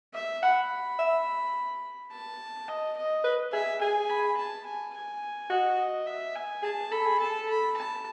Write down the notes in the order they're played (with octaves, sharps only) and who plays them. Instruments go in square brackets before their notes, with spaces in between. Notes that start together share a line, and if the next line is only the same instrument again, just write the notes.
[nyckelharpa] E5
[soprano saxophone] F#5 [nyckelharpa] B5
[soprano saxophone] E5
[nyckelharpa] A5
D#5
D#5
[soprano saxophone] B4
[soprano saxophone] G#4 [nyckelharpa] E5
[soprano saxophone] G#4 [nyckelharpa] G#5
[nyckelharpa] B5
A5
G#5
G#5
[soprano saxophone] F#4 [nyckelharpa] D#5
[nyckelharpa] D#5
E5
G#5
[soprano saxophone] G#4 [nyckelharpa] A5
[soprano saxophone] A4 [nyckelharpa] B5
[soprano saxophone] G#4
[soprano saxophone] A4 [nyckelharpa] A5
[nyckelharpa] B5
A5